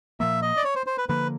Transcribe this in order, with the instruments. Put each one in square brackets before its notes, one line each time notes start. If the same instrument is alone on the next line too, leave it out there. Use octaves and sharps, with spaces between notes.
[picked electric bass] A#2 F3 A#3 [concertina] E5
[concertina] D#5
D5
C#5
C5
C5
B4
[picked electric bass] D3 F3 A#3 [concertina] B4